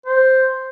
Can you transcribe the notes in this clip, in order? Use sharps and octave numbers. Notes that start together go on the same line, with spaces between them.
C5